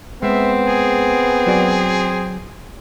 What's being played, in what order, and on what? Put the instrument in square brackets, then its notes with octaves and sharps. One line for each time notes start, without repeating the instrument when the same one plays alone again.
[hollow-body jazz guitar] G#3 [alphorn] B3 [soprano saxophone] C4 [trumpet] E5
[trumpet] G#4
[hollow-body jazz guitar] F#3 F#4 D5